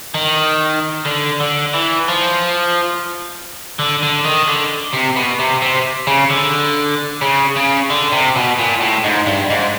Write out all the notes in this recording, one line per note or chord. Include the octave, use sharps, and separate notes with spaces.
D#3
D3
D3
E3
F3
D3
D3
D#3
D3
C3
B2
C3
C3
C#3
D3
C#3
C#3
D3
C3
B2
A#2
A2
G#2
G2
G#2